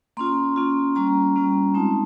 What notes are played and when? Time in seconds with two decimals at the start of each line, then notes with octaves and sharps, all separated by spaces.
0.17 A#3 C#4 F4 C6
0.56 A#3 C#4 F4
0.95 G3 A#3 C#4 F4 A#5
1.36 G3 A#3 C#4 F4
1.74 G#3 C4 D#4 A5